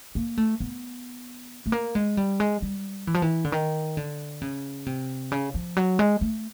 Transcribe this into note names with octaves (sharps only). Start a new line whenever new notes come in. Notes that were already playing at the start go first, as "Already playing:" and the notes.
A#3
A3
B3
A3
A#3
G#3
G3
G#3
G3
E3
F3
E3
D3
D#3
D3
C#3
C3
C#3
F3
F#3
G#3
A3